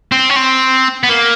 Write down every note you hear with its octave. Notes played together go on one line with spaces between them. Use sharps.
C4
C#4
C4
B3
A#3